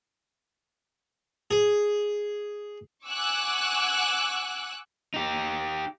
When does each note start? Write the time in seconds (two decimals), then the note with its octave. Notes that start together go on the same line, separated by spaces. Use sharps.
1.51 G#4
3.06 F#5 G#5 C#6 D6 E6 F#6
5.14 D#4 G4